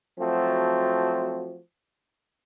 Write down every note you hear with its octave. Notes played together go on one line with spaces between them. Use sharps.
F3 F#3 A3 C4 F#4